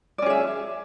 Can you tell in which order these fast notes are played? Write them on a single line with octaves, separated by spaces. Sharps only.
D5 C#4 G#4 E5